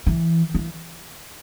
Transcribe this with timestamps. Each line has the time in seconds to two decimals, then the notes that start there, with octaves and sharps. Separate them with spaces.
0.07 E3
0.54 E3